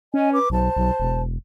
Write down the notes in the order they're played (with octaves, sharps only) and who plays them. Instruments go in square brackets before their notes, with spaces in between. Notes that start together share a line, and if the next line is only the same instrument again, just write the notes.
[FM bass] C#4 [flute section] D#5 G#5
[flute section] B4 D6
[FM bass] B1 [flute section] C5 A5
[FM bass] B1
E1